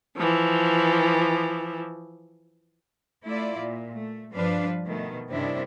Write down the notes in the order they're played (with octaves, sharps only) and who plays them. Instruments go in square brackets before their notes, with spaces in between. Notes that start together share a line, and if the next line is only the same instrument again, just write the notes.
[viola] E3 F3
[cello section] A3 E4 F4 D5
A#2
A3
G2 F3 G3 D4 B4 F5
B2 D#3 A3
G2 C3 D#3 C#4 D4 E4